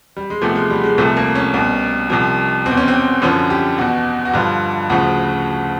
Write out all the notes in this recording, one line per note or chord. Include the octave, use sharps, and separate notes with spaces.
G3
G#3
E2 C3 F3 A3
G#3
G3
G#3
C2 C3 F3 A3
A#3
C#4
C2 B2
C2 C3 F3
B2 C4
E2
C#4
C4
F#2 D3 F3 C#4
G4
E2 B2 F#4
F#4
G2 D3 F3 F4
D2 C#3 F3 F#4